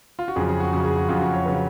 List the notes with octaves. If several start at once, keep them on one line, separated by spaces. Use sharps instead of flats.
F4
F#4
F2 C#3 F#3 G#4
G#4
F#4
F2 C#3 F#3 F#4
G#4
F#4
F2 C#3 F#3 F4
F#4
C#5
C#3 F#3 B4